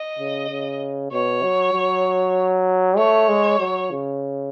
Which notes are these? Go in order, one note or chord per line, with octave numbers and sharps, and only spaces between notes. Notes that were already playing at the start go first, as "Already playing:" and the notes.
Already playing: D#5
C#3
C#3
B2 C#5
F#3
F#3
A3 C#5
G#3
F#3
C#3